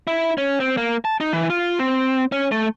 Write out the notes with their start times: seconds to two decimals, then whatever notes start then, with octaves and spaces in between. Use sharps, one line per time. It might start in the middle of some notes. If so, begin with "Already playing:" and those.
0.07 E4
0.38 C#4
0.60 C4
0.77 A#3
1.05 A5
1.20 D#4
1.33 E3
1.50 F4
1.79 C4
2.32 C#4
2.52 A3